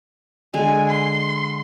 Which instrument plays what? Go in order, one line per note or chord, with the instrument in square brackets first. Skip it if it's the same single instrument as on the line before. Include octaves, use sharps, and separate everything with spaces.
[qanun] D3 G#3 [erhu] G#5
[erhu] C6